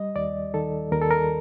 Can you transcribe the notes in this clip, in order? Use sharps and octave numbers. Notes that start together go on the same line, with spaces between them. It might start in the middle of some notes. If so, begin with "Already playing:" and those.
Already playing: G3 D#5
D#2 D5
D#3 A4
D#2 A#4
A4
A#4